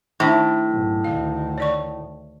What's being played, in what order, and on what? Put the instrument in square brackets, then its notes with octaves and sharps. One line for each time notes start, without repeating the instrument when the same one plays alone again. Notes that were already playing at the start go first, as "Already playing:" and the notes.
[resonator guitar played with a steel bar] A2 [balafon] D#3 D4 D#4
[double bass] B1 G#2
[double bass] D2 D#3 [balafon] F5
[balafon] C#5 D5 C#6